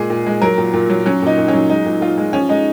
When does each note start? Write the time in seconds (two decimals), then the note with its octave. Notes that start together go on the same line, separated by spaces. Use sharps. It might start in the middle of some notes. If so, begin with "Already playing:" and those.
Already playing: A#2 G#3 G#4
0.10 A#2
0.26 G#3
0.42 F#3 A#4
0.58 A#2
0.74 A#2
0.90 F#3
1.06 F#3 C#4
1.22 A#2 D#4
1.38 A#2
1.48 C#4
1.53 F#3
1.70 G#3 D#4
1.85 A#2
2.01 A#2 F4
2.18 G#3
2.33 F3 C#4
2.49 G#3 D#4